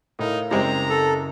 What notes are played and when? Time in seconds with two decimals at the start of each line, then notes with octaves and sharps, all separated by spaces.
0.19 A2 D#4 A#4 F5
0.51 F#1 G3 G#3 C4 A#5
0.90 A4